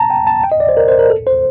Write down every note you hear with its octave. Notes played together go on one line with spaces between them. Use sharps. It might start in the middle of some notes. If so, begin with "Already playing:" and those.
Already playing: A5 A#5
G5
A5
G5
D#5
D5
C5
A#4
C5
A#4
A4
C5